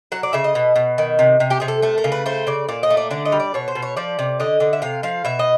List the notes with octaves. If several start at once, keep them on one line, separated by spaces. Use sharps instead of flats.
F#3 F#5
D5
C#3 E5
D#5
B2
B2
D#3
C3
C3
G4
C3 G#4
A4
A3 A4
A#4
C#3
B4
A3 C5
C#3 D5
A#2 D5
D#5
A3
D5
D3 D5
D#5
G3
D5
B2 C#5
C5
B2
C#5
F3 D5
C3
D3 D#5
D3
E5
C3 F5
F3 F5
B2 E5
D#5